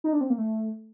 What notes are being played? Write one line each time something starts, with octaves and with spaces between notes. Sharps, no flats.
D#4
D4
C4
A#3
A3